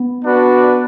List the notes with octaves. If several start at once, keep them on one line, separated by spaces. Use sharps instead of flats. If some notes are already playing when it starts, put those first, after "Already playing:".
Already playing: B3
D4 F#4 B4